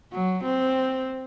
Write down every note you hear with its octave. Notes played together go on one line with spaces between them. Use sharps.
F#3
C4